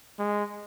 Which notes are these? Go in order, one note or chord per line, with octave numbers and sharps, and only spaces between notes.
G#3